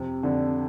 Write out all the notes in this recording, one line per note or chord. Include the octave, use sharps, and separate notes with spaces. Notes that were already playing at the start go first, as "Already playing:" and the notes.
Already playing: F2 C3
F2 D3